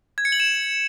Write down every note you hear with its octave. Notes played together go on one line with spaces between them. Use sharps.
G#6
C#7
F#7
E7